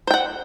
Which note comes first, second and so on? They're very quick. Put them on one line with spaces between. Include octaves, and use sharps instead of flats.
C5 G5 F#5